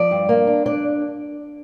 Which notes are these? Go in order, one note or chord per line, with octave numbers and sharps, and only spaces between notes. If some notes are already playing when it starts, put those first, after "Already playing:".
Already playing: F3 D5
G2
A#3
D4
D4 D5